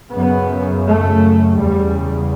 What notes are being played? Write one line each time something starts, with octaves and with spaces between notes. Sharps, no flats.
F#2 C#3 B3
A3
E2 C#3 G3